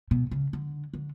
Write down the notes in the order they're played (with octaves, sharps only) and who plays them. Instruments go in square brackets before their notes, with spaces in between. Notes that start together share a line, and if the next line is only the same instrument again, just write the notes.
[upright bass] B2
C#3
D3
D3